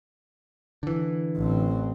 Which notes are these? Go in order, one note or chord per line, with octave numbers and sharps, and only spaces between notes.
D3 E3
A1 C4